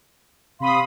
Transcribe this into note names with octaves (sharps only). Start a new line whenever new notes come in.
C3 F5 B5 C6 D#6